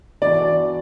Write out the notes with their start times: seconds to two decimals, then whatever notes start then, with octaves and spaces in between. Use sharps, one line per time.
0.22 E3 B3 D4 F#4 D5